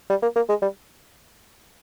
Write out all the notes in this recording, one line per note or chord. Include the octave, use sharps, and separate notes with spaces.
G3
A#3
A#3
G#3
G3